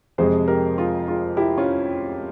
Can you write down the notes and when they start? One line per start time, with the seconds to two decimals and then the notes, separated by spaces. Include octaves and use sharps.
0.18 F2 C3 F3 G#3 G#4 C5
0.48 G4 A#4
0.78 F4 G#4
1.07 F4 G#4
1.37 E4 G4
1.58 C#4 F4